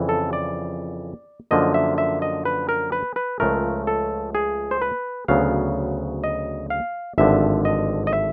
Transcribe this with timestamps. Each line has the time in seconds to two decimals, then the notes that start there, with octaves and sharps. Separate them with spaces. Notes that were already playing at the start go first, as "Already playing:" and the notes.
Already playing: F2 C#3 E3
0.09 A4
0.33 D5
1.51 F#2 D3 F3 A#3 D#5
1.74 E5
1.98 E5
2.22 D#5
2.45 B4
2.69 A#4
2.92 B4
3.16 B4
3.40 C#2 C#3 F3 A3 A#4
3.87 A4
4.35 G#4
4.71 C5
4.82 B4
5.28 D2 C#3 F#3 B3 F5
6.24 D#5
6.70 F5
7.18 G#1 G2 D3 F3 E5
7.65 D#5
8.07 D#5
8.13 E5